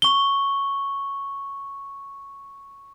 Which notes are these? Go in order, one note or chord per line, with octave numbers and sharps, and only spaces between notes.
C#6 G7